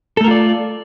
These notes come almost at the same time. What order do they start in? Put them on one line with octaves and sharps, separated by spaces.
A4 A3 A#4 F4 D5